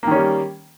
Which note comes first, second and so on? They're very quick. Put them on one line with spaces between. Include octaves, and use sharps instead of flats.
A#3 D#3 C#4 G3